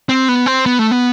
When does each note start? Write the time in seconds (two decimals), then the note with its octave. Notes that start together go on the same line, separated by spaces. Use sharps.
0.09 C4
0.29 B3
0.46 C4
0.66 B3
0.79 A3
0.91 B3